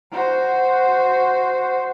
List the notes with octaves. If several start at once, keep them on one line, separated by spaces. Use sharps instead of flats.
F#4 C5